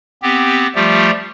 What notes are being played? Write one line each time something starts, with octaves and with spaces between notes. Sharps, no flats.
B3 C4 G4
F3 G3 A3 F4 G4